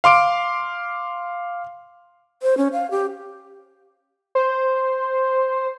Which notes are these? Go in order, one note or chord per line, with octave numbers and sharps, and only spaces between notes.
F5 C6 D6 D7
C5
C#4
F5
G4
C5